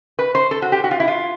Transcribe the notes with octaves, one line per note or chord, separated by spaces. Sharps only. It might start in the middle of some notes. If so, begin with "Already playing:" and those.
B4
C5
A4
F#4
G4
F#4
F4
E4
F4